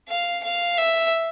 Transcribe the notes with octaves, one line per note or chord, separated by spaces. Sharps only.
F5
F5
E5